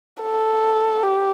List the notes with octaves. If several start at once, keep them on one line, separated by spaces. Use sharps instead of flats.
A4
G4